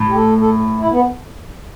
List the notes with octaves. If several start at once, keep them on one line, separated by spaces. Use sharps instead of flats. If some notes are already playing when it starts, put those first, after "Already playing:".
Already playing: A2
G4
A4
A4
E4
B3